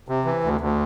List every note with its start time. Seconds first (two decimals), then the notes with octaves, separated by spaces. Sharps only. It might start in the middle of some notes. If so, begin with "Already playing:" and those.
0.08 C3
0.25 E3
0.44 D2
0.61 D2